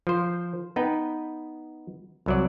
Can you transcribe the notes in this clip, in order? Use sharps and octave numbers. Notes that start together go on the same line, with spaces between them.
F3 C5
B3 D#4 B4 G5
C2 F#3 D5